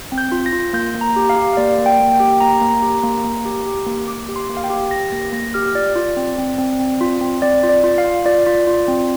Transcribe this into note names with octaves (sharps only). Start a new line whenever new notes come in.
C4
G6
F4
A#6
F4
A#3 G6
A#3
A#5
G4
F5
G4
F5
A#3 D5
A#3
G5
A#3
G5
G4
A#3 A#5
A#3
G4
A#3
A#3
G4
G4
A#3
A#3 D6
G4
C6
A#3
F5
G5
G4
G4 A#6
A#3 A#6
A#3 A#6
G4 F6
F4 D5
F4
C4
C4
C4
C4
F4
C4
C4 D5
F4
D5
F4
F5
F4
F4 D5
F4
F4
C4